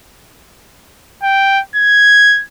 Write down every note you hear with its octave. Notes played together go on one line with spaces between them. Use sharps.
G5
G#6